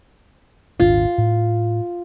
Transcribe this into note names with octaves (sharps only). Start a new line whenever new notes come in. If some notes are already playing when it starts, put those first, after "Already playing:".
D#1 G#1 D4 F4
A2